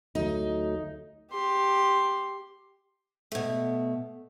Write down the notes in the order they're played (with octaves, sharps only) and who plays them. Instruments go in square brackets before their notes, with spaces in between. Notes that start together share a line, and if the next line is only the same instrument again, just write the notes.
[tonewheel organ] D2 F#3 A3 [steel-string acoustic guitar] D#4
[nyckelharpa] G4 C6
[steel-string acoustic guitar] B2 A3